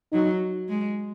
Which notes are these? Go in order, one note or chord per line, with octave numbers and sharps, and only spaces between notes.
F#3 D#4
G#3